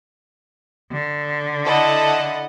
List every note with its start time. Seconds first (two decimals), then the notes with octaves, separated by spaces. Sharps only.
0.91 D3
1.66 E4 A4 D#5 F#5